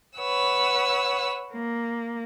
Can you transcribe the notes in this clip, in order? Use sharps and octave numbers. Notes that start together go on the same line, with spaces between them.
B4 C#5 F#5 E6
A#3